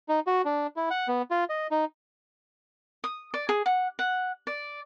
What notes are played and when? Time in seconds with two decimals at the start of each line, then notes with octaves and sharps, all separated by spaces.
0.09 D#4
0.27 F#4
0.45 D4
0.76 E4
0.90 F#5
1.08 B3
1.31 F4
1.49 D#5
1.71 D#4
3.04 D#6
3.34 D5
3.49 G#4
3.66 F#5
3.99 F#5
4.47 D5